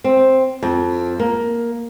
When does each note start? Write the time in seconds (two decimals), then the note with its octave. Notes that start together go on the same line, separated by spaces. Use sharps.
0.04 C4
0.63 F2
1.20 A#3